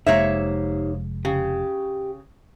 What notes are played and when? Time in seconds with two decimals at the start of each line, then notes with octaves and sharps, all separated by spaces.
0.06 F1 G#3 A#3 D#4 G4 C5 C#5 E5
1.25 C#3 G4